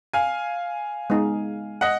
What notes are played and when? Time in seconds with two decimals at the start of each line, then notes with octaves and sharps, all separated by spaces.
0.13 F5 G#5
1.10 G#3 B3 D#4
1.81 D#5 F#5